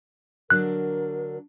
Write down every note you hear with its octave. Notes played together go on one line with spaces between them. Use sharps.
D3 F#3 D4 A#4 F#6